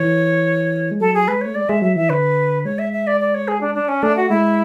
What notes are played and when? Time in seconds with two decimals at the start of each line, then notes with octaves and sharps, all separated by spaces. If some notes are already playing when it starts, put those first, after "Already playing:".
Already playing: E3 C#5
0.91 G#3
1.00 F#3 A4
1.14 G#4
1.28 G#3 B4
1.41 A3 C#5
1.55 G#3 D5
1.69 G#3 E5
1.82 F#3 E5
1.96 E3 E5
2.09 D3 B4
2.64 G#3 C#5
2.78 E5
2.92 E5
3.07 D5
3.20 D5
3.34 C#5
3.48 G#4
3.61 D4
3.74 D4
3.88 C#4
4.02 A3 D4
4.16 F#4
4.29 G#3 E4